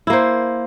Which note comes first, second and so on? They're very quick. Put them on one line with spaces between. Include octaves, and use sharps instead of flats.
E4 A#3 C5